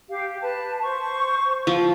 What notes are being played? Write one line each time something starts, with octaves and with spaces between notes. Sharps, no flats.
G4 F5
B4 A5
C5 C#6
F3 F5